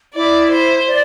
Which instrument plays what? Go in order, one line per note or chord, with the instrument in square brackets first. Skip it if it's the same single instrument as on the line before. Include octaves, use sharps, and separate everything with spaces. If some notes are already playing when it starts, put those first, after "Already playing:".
[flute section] E4 [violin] D5
[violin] C5
[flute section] D5